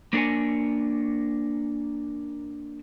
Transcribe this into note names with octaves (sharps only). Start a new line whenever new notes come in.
A#3 D4 A#4 C#5 G#5